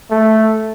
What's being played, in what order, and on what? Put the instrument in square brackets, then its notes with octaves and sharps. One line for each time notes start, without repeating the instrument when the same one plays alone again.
[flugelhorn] A3